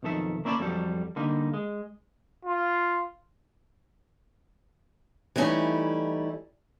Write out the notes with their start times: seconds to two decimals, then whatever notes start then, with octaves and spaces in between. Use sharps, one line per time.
0.03 B1 F2 D#3 A4 E5
0.45 A#3 C#4 E4 D5 G5 A5
0.60 F2 F#3 G3 A4
1.16 D3 G3 A#3 D#4
1.54 G#3
2.45 F4
5.36 E3 G3 A3 C#4 D#4 E4